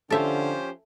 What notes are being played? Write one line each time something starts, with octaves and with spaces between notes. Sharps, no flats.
D3 F3 C#4 F4 G4 A4 C5 E5